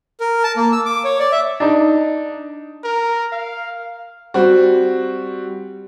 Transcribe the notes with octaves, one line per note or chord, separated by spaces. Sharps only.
A#4
A5
A#3
E6
D6
C#5
D5
E5
D4 D#4
A#4
F5
G3 C4 F#4